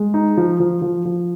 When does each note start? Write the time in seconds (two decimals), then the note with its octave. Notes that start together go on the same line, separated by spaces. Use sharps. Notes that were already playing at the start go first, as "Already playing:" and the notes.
Already playing: G#3
0.14 D#4
0.37 F3
0.60 F3
0.82 F3
1.05 F3